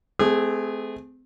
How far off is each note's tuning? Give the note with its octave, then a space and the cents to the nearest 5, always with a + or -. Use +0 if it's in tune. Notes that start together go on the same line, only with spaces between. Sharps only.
A3 -40 C4 -35 G#4 -20